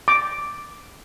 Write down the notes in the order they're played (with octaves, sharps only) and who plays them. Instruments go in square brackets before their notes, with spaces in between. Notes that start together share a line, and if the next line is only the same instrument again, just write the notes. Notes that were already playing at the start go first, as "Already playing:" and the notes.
[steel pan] D6